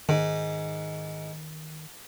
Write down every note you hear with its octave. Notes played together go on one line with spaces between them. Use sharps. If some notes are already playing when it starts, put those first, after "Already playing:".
G#2 D#3